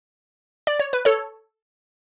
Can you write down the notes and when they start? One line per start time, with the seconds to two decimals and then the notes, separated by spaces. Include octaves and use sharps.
0.67 D5
0.80 C#5
0.93 B4
1.05 A4 C#5